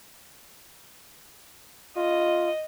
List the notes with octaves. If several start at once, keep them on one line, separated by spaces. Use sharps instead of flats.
F4 D#5